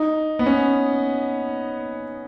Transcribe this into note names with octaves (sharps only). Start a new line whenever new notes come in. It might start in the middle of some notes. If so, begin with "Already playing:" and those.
Already playing: D#4
B3
C#4